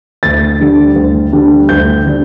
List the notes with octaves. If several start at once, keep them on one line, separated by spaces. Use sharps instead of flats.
D2 A6
D3 G3 D4
D2
D3 G3 D4
D2 G6
D3 G3 D4